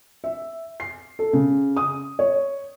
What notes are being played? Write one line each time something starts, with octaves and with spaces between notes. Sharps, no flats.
E5
C7
A4
C#3
D#6
C#5